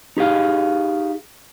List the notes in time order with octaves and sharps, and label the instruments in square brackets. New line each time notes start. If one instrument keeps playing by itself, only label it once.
[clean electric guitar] D#4 G4 G#4 F5